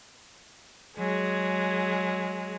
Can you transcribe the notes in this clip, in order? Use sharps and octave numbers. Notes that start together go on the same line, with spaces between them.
F#3 G#3 G#4